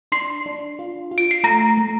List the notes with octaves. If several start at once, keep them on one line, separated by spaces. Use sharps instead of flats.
D4 C6 C7
D4
F4
F4
D7
C7
A3 A#5 A#6
A3